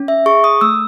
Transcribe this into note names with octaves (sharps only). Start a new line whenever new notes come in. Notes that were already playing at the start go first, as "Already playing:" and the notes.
Already playing: C#4
E5
G#4 C#6
D#6
A3 E6